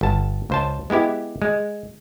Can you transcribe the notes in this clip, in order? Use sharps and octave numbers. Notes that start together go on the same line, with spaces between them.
G1 A5
C#2 C5 A5
G#3 B3 E4 G4
G#3